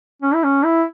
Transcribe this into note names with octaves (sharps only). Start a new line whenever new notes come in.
C#4
E4
C#4
E4